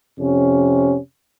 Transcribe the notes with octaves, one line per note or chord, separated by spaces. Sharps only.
F2 C3 C#4